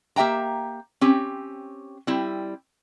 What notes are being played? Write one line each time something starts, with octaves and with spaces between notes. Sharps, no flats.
A#3 G4 E5 G5 A#5
C4 C#4 G4
G3 C4 E4